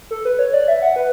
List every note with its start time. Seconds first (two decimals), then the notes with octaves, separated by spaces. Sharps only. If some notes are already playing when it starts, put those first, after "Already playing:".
0.11 A4
0.25 B4
0.39 C#5
0.53 D5
0.68 E5
0.82 F#5
0.96 B4